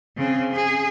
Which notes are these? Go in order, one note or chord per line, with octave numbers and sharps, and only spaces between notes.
C#3 C4
G#4